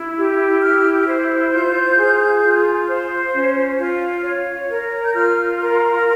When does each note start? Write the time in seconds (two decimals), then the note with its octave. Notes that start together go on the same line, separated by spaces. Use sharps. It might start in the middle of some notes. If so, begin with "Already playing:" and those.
Already playing: E4
0.17 G4
0.61 E4 F6
1.07 C5
1.52 F4 G6
1.97 G#4
2.42 F4
2.88 C5
3.33 C#4
3.79 F4
4.24 C#5
4.69 A#4
5.04 G6
5.13 F4 F6
5.59 A#4
5.97 F6